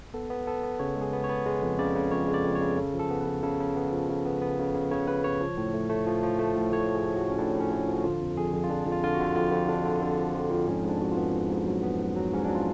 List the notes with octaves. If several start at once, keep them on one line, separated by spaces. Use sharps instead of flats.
B3 A4
B3
B3 A4
B3
C#3 C#5
G#3
G#4
B3
C#5
B3
G#3
F2
C#3 D5
C#3
F2 C#5
G#3
D5
F2
C#5
C#3
C#3 A4
F3
A4
B3
B4
C#3
C#3 A4
C#3
B3
F3
C#3
B3
B3
C#3
C#3
C#3 C#5
C#3 B4
C#3 C#5
F3
A2
A3
A3
F3
F3
A3
A2
A2 C#5
A2
G#4
F3
F#4
A2
C#4
A2 D4
A2
C#4
A2
F3
F#4
D3 F4
F2
F2 G#4
F2
F4
F2 D4
F2
F4
D3 F4
F#4
D3
F2 F4
F2
F2 D4
D3
D3
F3
F2
F2
G#2 C#4
G#2
D4
G#2 F#4
F4
B3
G#2
G#2
F#3
B3
G#2
F#3
G#2 C#4
F#3 D4
F4